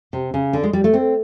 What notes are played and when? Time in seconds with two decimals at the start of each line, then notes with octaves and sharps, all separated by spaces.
0.13 C3
0.34 C#3
0.53 D3
0.63 G#3
0.73 G3
0.84 A3
0.94 C4